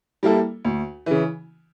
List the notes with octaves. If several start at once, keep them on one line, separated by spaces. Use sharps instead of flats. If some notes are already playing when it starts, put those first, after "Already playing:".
G3 A#3 E4 A4
D2
C#3 E3